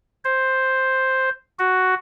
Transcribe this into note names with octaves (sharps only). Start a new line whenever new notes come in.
C5
F#4